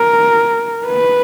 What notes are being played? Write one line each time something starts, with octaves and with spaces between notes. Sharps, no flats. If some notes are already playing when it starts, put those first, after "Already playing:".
Already playing: A#4
B4